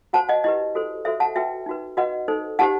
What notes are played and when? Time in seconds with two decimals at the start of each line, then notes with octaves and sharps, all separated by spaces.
0.13 F#4 C5 F#5 A5
0.29 D#5 F#5
0.44 E4 G4 B4 D#5
0.75 F#4 A4 C5
1.05 F#4 A4 C5 E5
1.20 F#5 A5
1.36 F#4 B4 E5 G5
1.66 D#4 F#4 B4
1.97 F#4 B4 D#5 F#5
2.28 D#4 A4 C5
2.59 D#4 G4 C5 F#5 A5